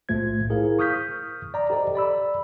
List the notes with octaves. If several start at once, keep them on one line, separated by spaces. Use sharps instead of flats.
B1 A2 A3 F4 C5 G#6
E4 G#4 A#4 C5 F5
C#6 D#6 F6 G6 B6
D5 A#5
G4 A4 C5 D5 D#5
D5 B5 E6